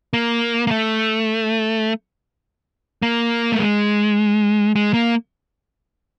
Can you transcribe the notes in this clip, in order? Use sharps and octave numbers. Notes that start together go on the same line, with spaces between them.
A#3
A#3
A3
A#3
A3
G#3
G#3
A#3